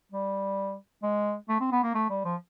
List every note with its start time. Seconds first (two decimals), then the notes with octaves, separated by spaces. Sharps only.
0.12 G3
1.03 G#3
1.49 A3
1.60 C4
1.72 B3
1.83 A#3
1.95 A3
2.10 G3
2.25 F3